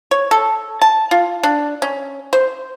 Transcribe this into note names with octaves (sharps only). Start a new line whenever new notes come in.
C#5
A4
A5
F4
D4
C#4
C5